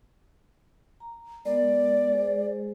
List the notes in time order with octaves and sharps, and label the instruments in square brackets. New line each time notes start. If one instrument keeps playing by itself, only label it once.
[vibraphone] A#5
[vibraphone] G#3 B3 A#4 [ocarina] D5
[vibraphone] G#3 G#4 C5